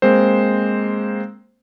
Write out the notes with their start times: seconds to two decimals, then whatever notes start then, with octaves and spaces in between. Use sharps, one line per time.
0.02 G#3 A#3 C4 C5